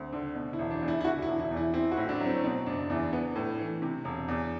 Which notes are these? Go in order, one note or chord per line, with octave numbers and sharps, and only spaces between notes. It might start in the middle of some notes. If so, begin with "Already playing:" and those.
Already playing: D2 C4
D3
B2
E4
E1
D4
E2
E4
E4
D3 F#4
E4
E1
E4
E2
E4
C4 E4
F#4
A2
D4
F#3
C4
B2 C4
F#1 D4
E2 E4
B3
A2
E3
C3
E1
E2